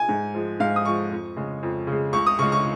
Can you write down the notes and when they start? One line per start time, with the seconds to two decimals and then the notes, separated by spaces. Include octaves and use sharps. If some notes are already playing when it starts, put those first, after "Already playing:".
Already playing: G#5
0.09 G#2
0.35 F3 G#3
0.60 G#2 F5
0.76 D#6
0.85 F3 G#3 C#6
1.11 F2
1.36 C#3 G#3
1.63 F2
1.87 C#3 G#3
2.13 C#2 C#6
2.27 D#6
2.39 C#3 G#3 C#6
2.52 C#6